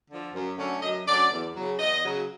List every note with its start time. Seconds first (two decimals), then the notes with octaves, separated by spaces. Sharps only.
0.09 D3 F3
0.34 F#2
0.58 D3 F#3 A3 C#4
0.82 F#2 D#5
1.06 D3 F#3 A3 C#4 D5
1.31 E2
1.55 C#3 F#3
1.79 E2 D#5
2.03 C#3 F#3